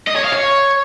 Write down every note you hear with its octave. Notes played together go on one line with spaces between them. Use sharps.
D#5
C#5
F5
C#5